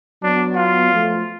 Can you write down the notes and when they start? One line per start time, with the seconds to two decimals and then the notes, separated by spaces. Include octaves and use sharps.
0.23 F#3 B3 D4
0.55 F4
0.92 F3 A3